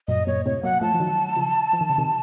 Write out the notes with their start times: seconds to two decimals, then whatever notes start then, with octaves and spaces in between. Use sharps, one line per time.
0.08 F#2 A#2 D#5
0.27 F#2 A#2 C#5
0.45 A2 C3 C#5
0.63 F#3 A#3 F#5
0.81 F3 A3 A5
0.94 F3
1.00 D#3 F#3
1.36 C#3 F3
1.73 F3
1.81 D#3
1.90 C#3
1.98 C3 D#3